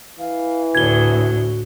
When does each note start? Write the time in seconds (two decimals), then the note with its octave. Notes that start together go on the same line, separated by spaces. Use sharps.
0.19 E3 F5
0.75 D2 A2 F#4 G#6 G7